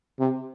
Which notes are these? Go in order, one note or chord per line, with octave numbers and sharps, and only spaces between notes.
C3